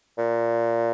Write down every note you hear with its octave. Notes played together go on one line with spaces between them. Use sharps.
A#2